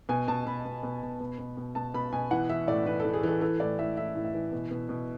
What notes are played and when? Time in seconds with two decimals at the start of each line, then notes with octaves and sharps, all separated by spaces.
0.09 B2 G#5
0.28 B2 A5
0.46 B2 B5
0.65 B2
0.83 B2
1.02 B2
1.20 B2
1.38 B2
1.57 B2
1.75 B2 A5
1.94 B2 B5
2.13 B2 G#5
2.31 E3 F#5
2.49 E3 E5
2.68 A2 D5
2.86 E3 B4
3.00 A4
3.04 E3
3.14 G#4
3.23 E3 A4
3.41 E3 A4
3.60 A2 D5
3.78 A2 E5
3.97 A2 E5
4.15 A2
4.25 E5
4.34 E3
4.52 B2
4.71 B2
4.89 B2